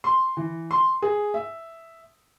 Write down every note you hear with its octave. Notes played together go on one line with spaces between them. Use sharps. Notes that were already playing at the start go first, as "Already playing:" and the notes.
C6
E3
C6
G#4
E5